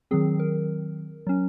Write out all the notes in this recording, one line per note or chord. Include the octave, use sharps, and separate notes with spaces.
D#3 F#3 C4 G#4
A#4
F#3 C#4